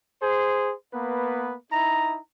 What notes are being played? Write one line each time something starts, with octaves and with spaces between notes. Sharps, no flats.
G#4 C5
A#3 B3 B4
D#4 E4 A#5